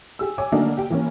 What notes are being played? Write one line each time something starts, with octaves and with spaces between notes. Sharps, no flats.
G4 G#4 E6
C#5 G#5 D6
D3 F#3 A3 A#3 D4 D#4
G4 G5
E3 A#3 C#4